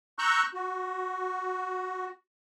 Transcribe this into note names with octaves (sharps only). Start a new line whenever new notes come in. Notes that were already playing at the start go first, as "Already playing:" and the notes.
A#5 C#6 E6 F#6 G6
F#4